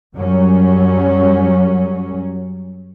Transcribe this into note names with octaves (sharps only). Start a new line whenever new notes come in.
F#2 F#3 G3 C#4